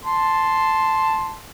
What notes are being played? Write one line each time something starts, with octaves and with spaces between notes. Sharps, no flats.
A5 C6